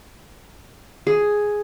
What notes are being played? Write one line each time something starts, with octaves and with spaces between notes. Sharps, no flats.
G#4